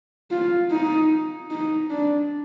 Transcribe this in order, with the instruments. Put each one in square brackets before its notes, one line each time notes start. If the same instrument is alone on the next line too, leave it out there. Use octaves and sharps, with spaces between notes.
[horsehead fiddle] F4
D#4
D#4
D4